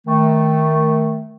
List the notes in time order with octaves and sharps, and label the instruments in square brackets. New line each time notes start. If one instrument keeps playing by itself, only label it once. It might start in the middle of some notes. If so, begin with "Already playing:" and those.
[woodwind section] D#3 A3